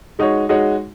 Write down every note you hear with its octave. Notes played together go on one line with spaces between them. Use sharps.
G#3 D#4 F#4 C#5
G#3 D#4 F#4 C#5